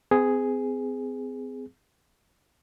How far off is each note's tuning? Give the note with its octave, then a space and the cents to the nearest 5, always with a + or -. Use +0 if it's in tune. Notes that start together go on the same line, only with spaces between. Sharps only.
C4 -40 G#4 +0